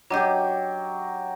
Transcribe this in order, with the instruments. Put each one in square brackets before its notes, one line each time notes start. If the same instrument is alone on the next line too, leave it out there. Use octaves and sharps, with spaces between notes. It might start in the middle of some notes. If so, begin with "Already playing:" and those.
[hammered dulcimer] F#3 G4 [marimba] D4 D#5 G6